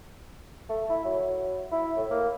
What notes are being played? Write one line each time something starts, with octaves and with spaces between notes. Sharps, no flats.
A3
E4
F#3
E4
A2
A#3